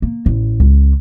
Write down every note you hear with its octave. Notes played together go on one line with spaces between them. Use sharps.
A#3
A1
C#2